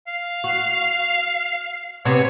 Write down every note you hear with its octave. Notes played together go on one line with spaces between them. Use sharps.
F5
F#4
C3 B3 C4 C#5